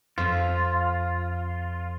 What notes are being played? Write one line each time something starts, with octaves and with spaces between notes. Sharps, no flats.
F2 F4